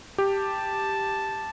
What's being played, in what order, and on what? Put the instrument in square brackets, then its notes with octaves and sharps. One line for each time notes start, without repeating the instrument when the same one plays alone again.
[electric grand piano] G4 [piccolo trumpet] A5